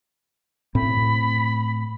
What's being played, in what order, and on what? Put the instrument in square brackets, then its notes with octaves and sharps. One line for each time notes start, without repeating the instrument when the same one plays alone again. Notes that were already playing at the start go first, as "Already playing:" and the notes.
[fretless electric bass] A2 C4 [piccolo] B5